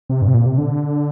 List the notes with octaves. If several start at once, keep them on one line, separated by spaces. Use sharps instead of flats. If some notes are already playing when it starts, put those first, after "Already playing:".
C3
G2
C3
A#2
C3
D3